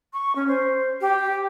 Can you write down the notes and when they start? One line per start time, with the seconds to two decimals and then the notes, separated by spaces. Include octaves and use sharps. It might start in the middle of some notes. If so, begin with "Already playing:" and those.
0.13 C#6
0.35 C#4
0.48 C5
1.01 G4